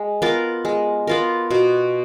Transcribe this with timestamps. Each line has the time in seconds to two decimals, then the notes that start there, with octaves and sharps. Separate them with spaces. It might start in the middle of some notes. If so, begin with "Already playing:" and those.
Already playing: G#3
0.22 B3 F4 A#4
0.65 G#3
1.07 B3 F4 A#4
1.51 B2